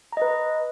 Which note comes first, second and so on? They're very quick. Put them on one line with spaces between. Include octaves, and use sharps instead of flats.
A#5 D#5 B4